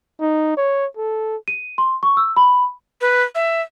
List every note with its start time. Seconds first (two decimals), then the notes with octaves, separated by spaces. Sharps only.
0.21 D#4
0.57 C#5
0.97 A4
1.48 D#7
1.78 C6
2.03 C#6
2.17 E6
2.37 B5
3.01 B4
3.35 E5